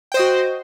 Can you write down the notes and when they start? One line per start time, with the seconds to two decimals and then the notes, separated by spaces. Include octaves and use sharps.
0.12 G5
0.14 C5
0.17 D#5
0.19 F#4